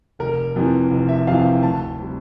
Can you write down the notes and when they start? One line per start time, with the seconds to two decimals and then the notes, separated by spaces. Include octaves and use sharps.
0.19 F1 A#4
0.56 F2 C3 E3
0.90 F1
1.09 E5
1.27 F2 C3 E3 F5
1.45 G5
1.62 D2 A5
1.98 C3 G3